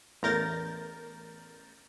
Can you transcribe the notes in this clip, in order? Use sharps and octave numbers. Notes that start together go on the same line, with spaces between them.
A1 E2 A#4 G6 A6 A#6